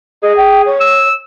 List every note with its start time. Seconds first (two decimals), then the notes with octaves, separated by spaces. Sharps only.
0.23 G#4 D#5
0.37 G5
0.66 C#5
0.80 E6